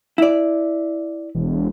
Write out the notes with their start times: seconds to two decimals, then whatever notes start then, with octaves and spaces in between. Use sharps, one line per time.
0.18 E4 D5
1.35 E1